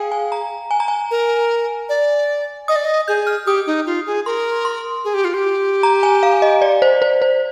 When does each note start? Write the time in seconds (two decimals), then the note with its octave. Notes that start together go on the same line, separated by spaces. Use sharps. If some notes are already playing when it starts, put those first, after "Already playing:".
Already playing: G#4 F5 G5 G#5
0.12 G#5
0.32 A#5
0.71 G#5
0.80 A#5
0.88 G#5
1.11 A#4
1.89 D5
2.68 D#5 D#6
2.76 D5
2.85 D#5
3.08 G#4 G6
3.27 F6
3.46 G4 D#6
3.67 D#4
3.86 F4
4.06 G#4
4.26 A#4 C6
4.65 C6
5.05 G#4
5.14 G4
5.25 F4
5.34 G4
5.83 A#5
6.03 G#5
6.23 F5
6.42 D#5
6.62 D5
6.82 C5
7.02 C5
7.22 C5